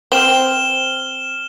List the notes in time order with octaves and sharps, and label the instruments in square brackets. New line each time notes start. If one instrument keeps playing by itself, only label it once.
[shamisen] C4 [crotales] F6 E7 G7